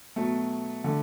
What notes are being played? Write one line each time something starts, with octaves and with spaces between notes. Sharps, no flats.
B2 F#3 A3
D3 A3